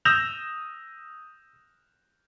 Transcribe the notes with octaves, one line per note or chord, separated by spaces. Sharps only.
D#6 E6 G6 A#6 E7 F7